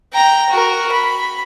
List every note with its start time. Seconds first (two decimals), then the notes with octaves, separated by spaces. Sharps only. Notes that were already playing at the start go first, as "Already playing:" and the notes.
0.13 G5 A#5
0.50 F#4 A#4
0.92 B5